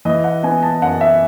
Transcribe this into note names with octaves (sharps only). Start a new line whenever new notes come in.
E3 D#5
F#5
B3 G#5
A5
F#2 F#5
E5